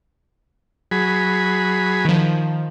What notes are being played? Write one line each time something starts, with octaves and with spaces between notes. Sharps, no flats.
F#3 G#4 B5
D#3 F3